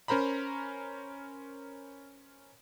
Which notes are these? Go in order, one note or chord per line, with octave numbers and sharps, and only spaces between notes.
C#4 A#4 C5 A#5 B5